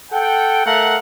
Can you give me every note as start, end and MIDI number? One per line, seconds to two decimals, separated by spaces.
0.11 0.65 69
0.11 0.65 78
0.11 0.65 79
0.65 0.98 57
0.65 0.98 70
0.65 0.98 77
0.65 0.98 78